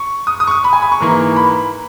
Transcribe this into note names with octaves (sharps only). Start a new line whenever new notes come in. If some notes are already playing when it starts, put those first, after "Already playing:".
Already playing: C#6
D#6
D#6
C#6
D#6
B5
G#5
B5
C#6
G#2 E3 A#3
B5